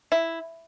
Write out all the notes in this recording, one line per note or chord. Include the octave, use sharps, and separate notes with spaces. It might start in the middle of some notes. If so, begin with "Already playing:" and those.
E4